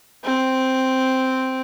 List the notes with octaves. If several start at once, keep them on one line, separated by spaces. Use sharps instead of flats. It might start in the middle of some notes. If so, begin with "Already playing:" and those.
C4